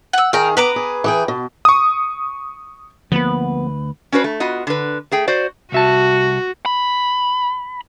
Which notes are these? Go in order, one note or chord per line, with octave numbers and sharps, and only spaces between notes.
F#5 E6
D#3 G#4 F5 G5 A#5
B3 B4 A#5 D6
G#4
E3 G#4 G5
B2
C#6 D#6
D2 F3 A#3 B3 B4
C#4 D4 F#4 B4 C5
A3
B3 F4 F#4 D#5
D3 B4
A3 G#4 G5
F#4 C5 D5
C2 F#4 E5 A5
B5